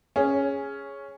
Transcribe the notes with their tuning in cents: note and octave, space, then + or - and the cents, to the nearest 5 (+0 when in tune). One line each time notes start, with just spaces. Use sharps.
C#4 +0 G#4 -5